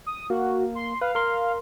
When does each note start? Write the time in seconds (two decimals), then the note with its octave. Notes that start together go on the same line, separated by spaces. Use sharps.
0.06 D#6
0.30 A#3 F#4
0.75 C6
1.01 B4 F5
1.15 A#4 C6